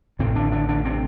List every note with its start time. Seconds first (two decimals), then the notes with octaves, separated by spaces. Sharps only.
0.19 A1 A2 C3 C4
0.35 D3 D4
0.52 D3 D4
0.69 D3 D4
0.85 C3 C4